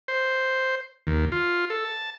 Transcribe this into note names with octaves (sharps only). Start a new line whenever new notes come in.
C5
D#2
F4
A4
A5